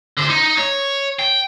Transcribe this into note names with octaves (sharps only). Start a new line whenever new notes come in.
D3 C5
D#4
C#5
G5